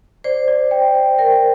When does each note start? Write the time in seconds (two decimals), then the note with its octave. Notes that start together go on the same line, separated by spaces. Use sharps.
0.24 C5 D5
0.48 D5
0.71 G5
0.95 G5
1.19 A#4 G5